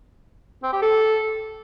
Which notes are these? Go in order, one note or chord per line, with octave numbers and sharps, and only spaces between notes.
C4
G4
A4